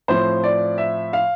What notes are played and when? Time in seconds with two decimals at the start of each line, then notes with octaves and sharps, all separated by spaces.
0.08 A2 F3 C4 C5
0.44 D5
0.78 E5
1.13 F5